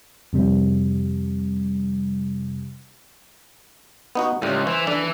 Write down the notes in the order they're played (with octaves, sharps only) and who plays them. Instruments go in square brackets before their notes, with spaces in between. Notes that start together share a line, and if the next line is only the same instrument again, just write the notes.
[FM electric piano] F2 C3 G3
[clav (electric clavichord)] B3 D#4 F#4
[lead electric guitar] C#2 [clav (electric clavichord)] A2 G3
[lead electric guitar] E3 [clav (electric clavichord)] C5
[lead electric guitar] E3 [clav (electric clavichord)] D4 A4